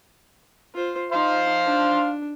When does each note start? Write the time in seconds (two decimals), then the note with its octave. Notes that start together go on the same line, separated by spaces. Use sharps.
0.75 F4 C5
1.12 D#4 C5 F5 C6
1.66 D4